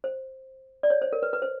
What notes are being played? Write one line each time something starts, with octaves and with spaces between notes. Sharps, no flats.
C5
D5
C#5
C5
A#4
B4
B4
C5